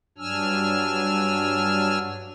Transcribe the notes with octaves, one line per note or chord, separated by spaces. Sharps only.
G2 F#3 D4 G#5 E6 F6